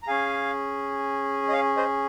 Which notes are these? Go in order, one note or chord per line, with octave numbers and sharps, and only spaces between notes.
A#5
C#4 G#4 F5 G#5
D#5
C#5 F5
C5 D#5